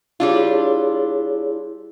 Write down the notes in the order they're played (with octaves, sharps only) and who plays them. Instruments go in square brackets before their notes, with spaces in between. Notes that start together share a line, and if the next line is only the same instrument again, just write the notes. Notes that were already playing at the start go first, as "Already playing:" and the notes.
[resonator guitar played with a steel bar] G3 D4 F4 [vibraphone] E4 G#4 C#5